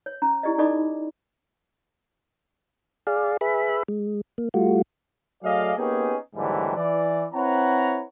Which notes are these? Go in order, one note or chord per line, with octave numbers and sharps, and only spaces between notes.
C#5
C#4 A#5
E4 G4 D5 D#5
D#4 A4 D5 D#5 B5 D6
G#4 D5 F5
G#4 B4 E5 B5
G#3
A#3
G3 A3 F4 F#4
F#3 A3 G#4 D5 D#5 F5
A#3 B3 C#4 D#4 G4 G#4
D#2 G#2 D3 E3 F#3 G3
E3 D5
C4 E4 B4 C#5 F#5 A#5